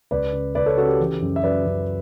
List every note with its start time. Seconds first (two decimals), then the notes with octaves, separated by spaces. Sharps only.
0.11 C#2 B4 D5
0.33 C#3
0.55 C#2 B4 D5
0.66 A4 C#5
0.77 C#3 F#4 A4
0.88 G4
1.00 E3
1.22 F#2
1.36 E5
1.43 F#2 B4 D5
1.66 F#2